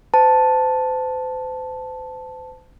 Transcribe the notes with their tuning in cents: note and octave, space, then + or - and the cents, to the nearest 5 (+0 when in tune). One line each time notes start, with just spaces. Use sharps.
C5 -40 A5 +0